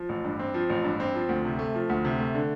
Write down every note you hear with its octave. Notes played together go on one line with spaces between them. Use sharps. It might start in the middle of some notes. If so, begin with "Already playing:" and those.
Already playing: F3
A1
G2
C4
F3
A1
G2
C4
F3
D2
C3
A3
F3
D2
C3
A3
D3